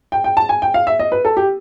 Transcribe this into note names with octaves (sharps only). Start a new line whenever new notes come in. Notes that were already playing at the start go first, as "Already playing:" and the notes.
G5
G5
A5
G#5
G5
F5
E5
D#5
B4
A4
G4